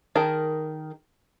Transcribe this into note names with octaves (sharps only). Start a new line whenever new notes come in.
D#3 G#4 A#4 A5